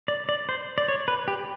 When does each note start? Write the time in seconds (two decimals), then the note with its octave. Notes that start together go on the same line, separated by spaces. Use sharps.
0.08 D5
0.29 D5
0.49 C5
0.78 D5
0.88 C#5
1.08 B4
1.28 G4